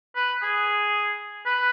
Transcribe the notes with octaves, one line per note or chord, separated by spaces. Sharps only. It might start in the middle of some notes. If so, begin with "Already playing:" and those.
B4
G#4
B4